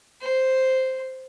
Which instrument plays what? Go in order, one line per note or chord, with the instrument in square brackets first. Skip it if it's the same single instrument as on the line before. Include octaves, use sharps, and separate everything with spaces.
[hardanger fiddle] C5